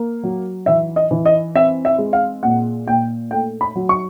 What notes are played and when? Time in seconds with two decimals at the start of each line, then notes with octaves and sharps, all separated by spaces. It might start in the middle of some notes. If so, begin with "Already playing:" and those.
Already playing: A#3
0.23 F#3
0.66 E3 E5
0.96 D#5
1.11 E3
1.26 D#5
1.55 C4 E5
1.85 E5
1.98 G#3
2.13 F5
2.43 A#2 F#5
2.87 A#2 G5
3.31 A3 G5
3.61 B5
3.76 F#3
3.89 C#6